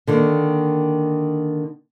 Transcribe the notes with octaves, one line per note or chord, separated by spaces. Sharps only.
D3 D#3 A#3